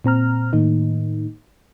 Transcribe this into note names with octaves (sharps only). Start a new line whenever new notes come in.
A#2 C4 A#5 F6
A2 D#3 A#3 D#4